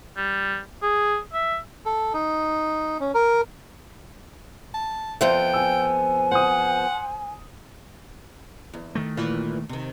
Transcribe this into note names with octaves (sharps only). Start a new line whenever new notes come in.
G3
G#4
E5
A4
D#4
C#4
A#4
A5
F2 F3 B3 C5 E5 G5
G#5 E6
C5 F#5 D#6
E2
D#3 A3
A#2 E3 F4
C3 D#3